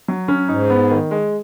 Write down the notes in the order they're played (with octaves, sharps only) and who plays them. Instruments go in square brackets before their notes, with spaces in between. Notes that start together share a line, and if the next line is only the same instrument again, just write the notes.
[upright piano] F#3
C#4
[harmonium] G#2 [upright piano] D#4
[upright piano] B3
D#3
G#3